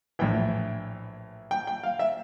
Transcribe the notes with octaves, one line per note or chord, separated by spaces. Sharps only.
A#1 A2 E3 G5
G5
G5
F5
E5